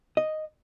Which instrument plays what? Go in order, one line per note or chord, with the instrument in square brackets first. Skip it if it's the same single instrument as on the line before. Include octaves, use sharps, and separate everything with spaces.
[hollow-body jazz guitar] D#5